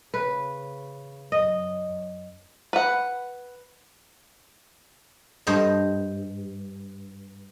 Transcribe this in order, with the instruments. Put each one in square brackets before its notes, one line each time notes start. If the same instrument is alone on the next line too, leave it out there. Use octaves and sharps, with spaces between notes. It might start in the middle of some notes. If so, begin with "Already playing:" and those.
[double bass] C#3 [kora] B4
[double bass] F#2 [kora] D#5
[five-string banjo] B4 F#5
[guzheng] G2 C5 D#5